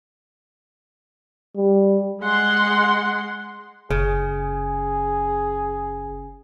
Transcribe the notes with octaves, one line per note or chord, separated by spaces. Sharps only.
G3
G#3 F#5 C6
F#1 C#3 G#4